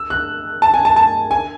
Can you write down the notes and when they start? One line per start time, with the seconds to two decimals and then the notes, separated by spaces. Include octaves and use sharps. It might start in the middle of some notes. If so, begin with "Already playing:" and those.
Already playing: E6
0.10 F#6
0.62 A5
0.74 G#5
0.85 A5
0.96 A5
1.31 G#5